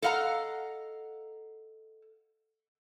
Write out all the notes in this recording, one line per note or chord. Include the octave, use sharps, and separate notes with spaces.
A4 D#5 F5 F#5 A#5